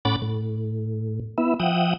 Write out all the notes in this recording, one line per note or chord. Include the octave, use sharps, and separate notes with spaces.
A2 C#4 F#5 B5 D6 A6
A2
B3 E4 E5
F3 E5 F#5 G5 D#6